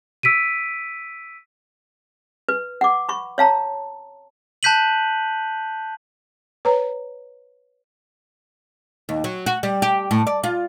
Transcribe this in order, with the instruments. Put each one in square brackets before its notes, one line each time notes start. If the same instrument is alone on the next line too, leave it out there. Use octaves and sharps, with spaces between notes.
[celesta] E6 B6 D7 D#7
[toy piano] B4
F#5 D6
B5 C#6
C#5 F5 A5 A#5
[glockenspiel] A5 F#6 G6 B6 D#7 F#7
[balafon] B4 C#5 A#5
[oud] D#2
F#3
F#4
G3
G4
A2
D5
F4